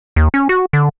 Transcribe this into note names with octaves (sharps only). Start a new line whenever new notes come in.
D#2
C#4
F#4
D3